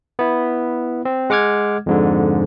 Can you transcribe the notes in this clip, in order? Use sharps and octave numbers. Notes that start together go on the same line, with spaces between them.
B3 E4
C4
G#3 F#5 D6 F6 G#6
F2 G#2 D3